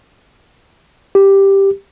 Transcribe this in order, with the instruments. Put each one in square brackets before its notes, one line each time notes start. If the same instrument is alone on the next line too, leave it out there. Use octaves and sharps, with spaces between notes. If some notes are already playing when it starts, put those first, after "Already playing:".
[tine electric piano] G4